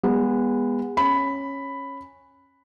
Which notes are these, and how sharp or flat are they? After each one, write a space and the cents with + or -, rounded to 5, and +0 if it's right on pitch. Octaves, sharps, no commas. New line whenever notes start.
G#3 -35 B3 -15
C#4 -10 B5 +5